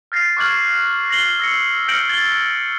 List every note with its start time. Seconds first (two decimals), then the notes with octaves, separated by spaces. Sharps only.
0.12 F6 G6 A6 A#6 C7
0.37 C#6 D6 F6 F#6 G#6 F#7
1.09 A6 A#6 C7 F#7 G7
1.39 E6 A#6 C#7
1.88 F6 G6 A#6 C#7 D7 F#7
2.09 G#6 A6 F#7 G7